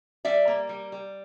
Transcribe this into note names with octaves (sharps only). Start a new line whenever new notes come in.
G3 D5 E5
A#3
G3
G3